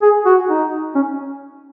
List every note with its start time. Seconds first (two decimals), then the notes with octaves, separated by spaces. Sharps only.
0.02 G#4
0.26 F#4
0.49 D#4
0.95 C#4